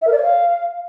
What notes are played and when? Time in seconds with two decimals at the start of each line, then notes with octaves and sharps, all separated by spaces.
0.02 E5
0.07 A#4
0.12 D5
0.17 C#5
0.23 F5